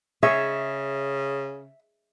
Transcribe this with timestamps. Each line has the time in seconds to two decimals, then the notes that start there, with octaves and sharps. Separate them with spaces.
0.23 C#3 G#4 C#5 D#5 E5